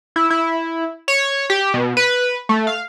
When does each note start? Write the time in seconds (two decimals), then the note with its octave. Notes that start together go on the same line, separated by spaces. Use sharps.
0.16 E4
0.30 E4
1.08 C#5
1.50 G4
1.74 B2
1.97 B4
2.49 A3
2.67 F5